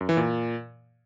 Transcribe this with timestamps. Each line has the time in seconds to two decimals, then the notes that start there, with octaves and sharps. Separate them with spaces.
0.01 F#2
0.09 E3
0.17 A#2